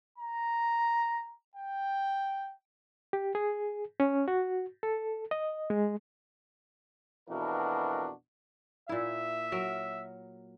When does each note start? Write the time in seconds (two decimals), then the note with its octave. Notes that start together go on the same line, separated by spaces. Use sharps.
0.18 A#5
1.55 G5
3.13 G4
3.35 G#4
4.00 C#4
4.28 F#4
4.83 A4
5.31 D#5
5.70 G#3
7.30 F2 B2 E3 D4 F#4 A#4
8.89 A#2 E4 E5
9.52 F#3 A#4